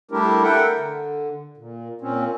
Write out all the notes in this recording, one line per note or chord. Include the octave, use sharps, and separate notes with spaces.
G3 A3 D4 E4 G4 A#4
A4 A#4 E5 F#5 G5
D3
A#2
A#2 C4 C#4